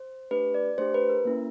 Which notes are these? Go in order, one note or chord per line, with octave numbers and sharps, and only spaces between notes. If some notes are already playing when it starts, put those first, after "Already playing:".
Already playing: C5
A3 D4 G4 B4
D5
A3 D4 G4 C5
B4
A#4
A#3 C#4 E4